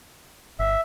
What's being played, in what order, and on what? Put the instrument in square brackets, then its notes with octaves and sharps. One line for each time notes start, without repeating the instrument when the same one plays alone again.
[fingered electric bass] G1 [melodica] E5